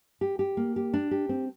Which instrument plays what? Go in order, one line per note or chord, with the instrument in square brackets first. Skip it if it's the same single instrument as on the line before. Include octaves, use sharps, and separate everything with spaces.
[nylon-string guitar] G4
G4
A#3
G4
D4
G4
C4